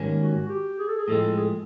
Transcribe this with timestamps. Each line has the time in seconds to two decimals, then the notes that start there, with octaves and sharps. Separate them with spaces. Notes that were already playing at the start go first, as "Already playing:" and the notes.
Already playing: G#2 D#3 G3 A#3 C#4
0.20 F#4
0.49 G4
0.79 G#4
0.88 A4
0.98 G#4
1.08 A2 F3 G#3 C4 A4
1.37 G#4